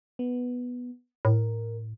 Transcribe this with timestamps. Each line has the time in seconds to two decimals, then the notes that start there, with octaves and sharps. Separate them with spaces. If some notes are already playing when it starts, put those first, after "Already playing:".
0.19 B3
1.25 A2 A#4